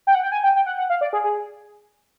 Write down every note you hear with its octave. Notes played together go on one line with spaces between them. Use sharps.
G5
F#5
G5
G#5
G5
G5
F#5
F#5
F5
D5
G#4
G#4